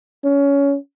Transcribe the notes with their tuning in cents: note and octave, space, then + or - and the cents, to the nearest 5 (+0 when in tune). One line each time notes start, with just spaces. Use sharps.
C#4 +20